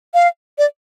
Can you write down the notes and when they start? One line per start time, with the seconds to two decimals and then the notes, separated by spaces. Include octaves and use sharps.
0.14 F5
0.58 D5